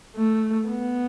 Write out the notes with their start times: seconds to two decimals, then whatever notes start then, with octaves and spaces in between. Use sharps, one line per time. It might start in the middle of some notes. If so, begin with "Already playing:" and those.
0.17 A3
0.69 B3